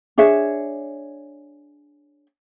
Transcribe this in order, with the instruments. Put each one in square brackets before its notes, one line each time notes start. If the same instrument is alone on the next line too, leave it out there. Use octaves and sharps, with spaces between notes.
[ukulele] D4 G#4 C#5 E5